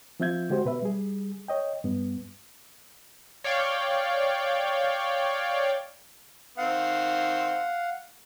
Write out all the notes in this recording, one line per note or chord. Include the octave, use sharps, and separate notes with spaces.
F3 C4 F4 E5 G6 G#6
D3 G#3 F#4 G4 C5
B2 B4 E5
G3 G#4
C#5 D#5 G5
G2 B3
C#5 D5 F5 G5
D#3 C4 F5 F#5